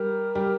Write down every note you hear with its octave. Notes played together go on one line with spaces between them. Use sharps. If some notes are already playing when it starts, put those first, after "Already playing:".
Already playing: G3 G4 A#4
G3 G4